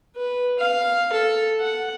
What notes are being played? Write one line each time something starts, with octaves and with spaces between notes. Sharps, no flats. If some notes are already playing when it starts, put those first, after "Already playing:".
B4
F5
A4
F#5